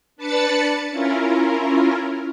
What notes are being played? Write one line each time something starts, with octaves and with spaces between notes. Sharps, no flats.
D4 B4 A5 B5 A6 C#7
C#4 E4 F4 A#4